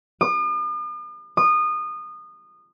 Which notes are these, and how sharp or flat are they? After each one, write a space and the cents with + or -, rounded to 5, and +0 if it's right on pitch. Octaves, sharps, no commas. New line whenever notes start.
D#6 -45
D#6 -25